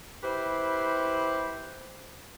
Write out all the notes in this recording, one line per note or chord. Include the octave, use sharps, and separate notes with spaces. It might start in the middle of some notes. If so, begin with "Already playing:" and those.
E4 G4 B4 C5